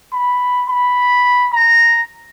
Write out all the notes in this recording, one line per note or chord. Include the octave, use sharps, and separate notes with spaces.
B5
B5
A#5